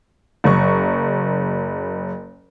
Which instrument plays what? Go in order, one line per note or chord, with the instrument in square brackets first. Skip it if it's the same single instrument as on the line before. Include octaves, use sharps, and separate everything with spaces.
[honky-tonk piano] F#1 C#6